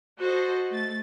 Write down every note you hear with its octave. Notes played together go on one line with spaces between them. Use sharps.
F#4 A4 C5 D#5
A3 A6